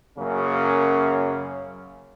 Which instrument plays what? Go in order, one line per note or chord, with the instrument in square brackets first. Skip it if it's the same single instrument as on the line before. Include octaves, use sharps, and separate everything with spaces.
[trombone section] F#2 C#3 A#3 C#4